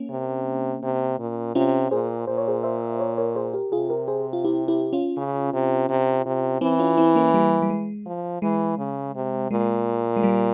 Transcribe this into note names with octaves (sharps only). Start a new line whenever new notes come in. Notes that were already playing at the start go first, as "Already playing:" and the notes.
Already playing: A#3 C#4
C3
C3
A#2
C3 C#4 F4
A#2 G#4 C5
A#2 C5
C#5
G#4 C5
C5 E5
A#4 C#5
A#4 C#5
G#4 C5
G4 A#4
C3 F4 G#4
G4 A#4
G#4 C5
F4
E4 G4
E4 G4
C#4 F4
C#3
C3
C3
C3
E3 C4 E4
C#4 F4
C4 E4
A#3 C#4
G3 A#3
G3
G#3
F3
E3 G#3
C#3
C3
A#2 G#3
G#3
G3 A#3